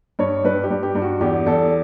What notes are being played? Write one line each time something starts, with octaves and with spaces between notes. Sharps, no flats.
G2 C#5
G2 B4
G4
G2
G4
G2
F#4
E2 G4
E2 A4